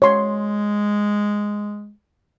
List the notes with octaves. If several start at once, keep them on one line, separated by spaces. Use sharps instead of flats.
G#3 C#5 C6